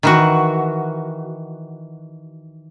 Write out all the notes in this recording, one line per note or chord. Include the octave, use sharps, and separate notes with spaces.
D#3 E3 F#4